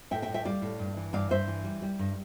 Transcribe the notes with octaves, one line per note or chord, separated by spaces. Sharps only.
A2 E5 G5
E5 G5
A2
E5 G5
G3 D5 F5
A2
G2
E3
G2 D5 F5
G2 C5 E5
E3
G3
G3
G2